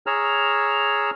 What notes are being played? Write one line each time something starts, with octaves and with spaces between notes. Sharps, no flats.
G#4 C#5 A#5 E6 F6